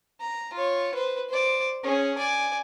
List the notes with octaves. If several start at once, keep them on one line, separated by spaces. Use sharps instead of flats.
A#5
F4 C#5
B4 C5
C5 D5
C#4 G#4
D5 G#5